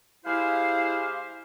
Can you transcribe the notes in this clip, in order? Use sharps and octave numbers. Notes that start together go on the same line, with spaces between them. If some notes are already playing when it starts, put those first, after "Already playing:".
G#3 E4 G4 C5 F5